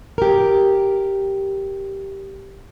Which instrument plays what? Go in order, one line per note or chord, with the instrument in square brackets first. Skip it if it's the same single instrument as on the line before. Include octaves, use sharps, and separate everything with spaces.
[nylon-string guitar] G4 A#4